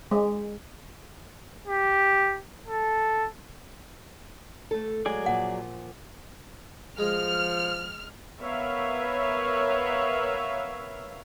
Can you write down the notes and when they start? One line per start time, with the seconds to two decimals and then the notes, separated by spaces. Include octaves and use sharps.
0.11 G#3
1.67 G4
2.67 A4
4.71 A3 A4
5.06 F#3 G#3 G#4 D5
5.26 A#2 F3 F#5
6.98 F3 G#3 F6
8.40 B3 A#4 B4 C#5 E5 F5